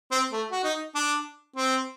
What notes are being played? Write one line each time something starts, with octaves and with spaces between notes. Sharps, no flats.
C4
A3
F#4
D#4
D4
C4